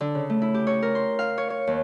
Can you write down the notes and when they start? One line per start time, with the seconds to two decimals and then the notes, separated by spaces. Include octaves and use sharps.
0.01 D3
0.15 C#3
0.30 A3
0.42 E4
0.54 G4
0.67 C#5
0.82 A#4
0.95 C6
1.19 F5
1.38 C#5
1.50 C#5
1.67 D#2